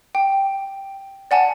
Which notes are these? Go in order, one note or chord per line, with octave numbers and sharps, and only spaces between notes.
G5
D5 F#5 G#5 A5